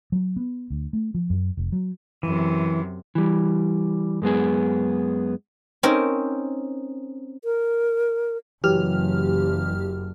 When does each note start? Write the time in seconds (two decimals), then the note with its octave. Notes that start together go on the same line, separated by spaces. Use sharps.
0.12 F#3
0.36 B3
0.70 D2
0.93 A3
1.14 F3
1.30 F#2
1.57 F1
1.72 F#3
2.23 F#2 C3 E3
3.15 E3 G3
4.22 F#2 G#3 B3 G#4
5.83 C4 C#4 D#4 A#4
7.44 A#4
8.64 F#1 E3 F#3 G4 F6